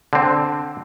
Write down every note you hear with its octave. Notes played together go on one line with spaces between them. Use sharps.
D3 C4